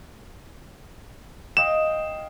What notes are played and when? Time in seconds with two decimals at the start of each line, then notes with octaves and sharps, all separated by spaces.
1.57 D#5 F5 G5 E7